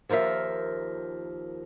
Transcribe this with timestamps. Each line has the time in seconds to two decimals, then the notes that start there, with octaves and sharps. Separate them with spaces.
0.09 D#2 F3 A#4 C5 E5